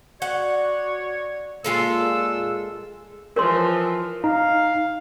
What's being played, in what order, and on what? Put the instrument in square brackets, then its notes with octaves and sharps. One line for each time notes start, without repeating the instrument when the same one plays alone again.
[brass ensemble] F#4 D5 [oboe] C#5 [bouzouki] F#5
[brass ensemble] A#2 [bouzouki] G#3 F4 A4 [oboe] E6
[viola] E3 F3 [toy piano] A#4 C#5 C6
[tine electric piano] D#4 A#5 [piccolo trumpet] F5